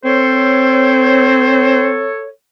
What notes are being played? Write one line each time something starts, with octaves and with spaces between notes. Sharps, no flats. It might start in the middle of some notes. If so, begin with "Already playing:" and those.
C4 A4 C5 C#5